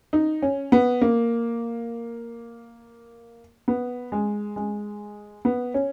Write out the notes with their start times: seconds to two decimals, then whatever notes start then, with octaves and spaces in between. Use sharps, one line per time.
0.13 D#4
0.42 C#4
0.72 B3
1.02 A#3
3.68 B3
4.12 G#3
4.56 G#3
5.45 B3
5.74 C#4